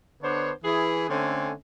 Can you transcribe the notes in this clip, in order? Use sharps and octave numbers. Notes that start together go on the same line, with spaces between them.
D3 B3 D4 C5 C#5
E3 G#4
D3 A3 C4 C#4 G#5